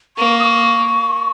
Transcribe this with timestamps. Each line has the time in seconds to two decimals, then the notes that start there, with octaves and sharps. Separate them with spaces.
0.17 A#3 C#6
0.40 D#6
0.44 C#6